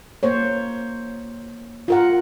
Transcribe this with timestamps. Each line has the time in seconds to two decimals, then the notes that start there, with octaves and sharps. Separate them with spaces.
0.23 A#3 C5 C#5
1.88 F4 A#4 F#5